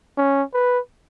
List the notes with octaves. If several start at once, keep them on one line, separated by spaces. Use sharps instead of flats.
C#4
B4